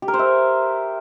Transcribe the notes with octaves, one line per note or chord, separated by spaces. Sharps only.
G4
A#4
C5
E5